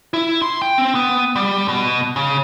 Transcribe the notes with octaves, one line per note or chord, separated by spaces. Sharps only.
E4
C6
G5
C4
B3
G3
B2
C#3